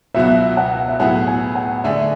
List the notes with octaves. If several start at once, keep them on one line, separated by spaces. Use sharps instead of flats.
C#2 B2 F#3 B3 F#4 E5
F#5
E5
A2 F#3 B3 E4 G#4 F#5
G#5
F#5
D3 A3 D4 G#4 E5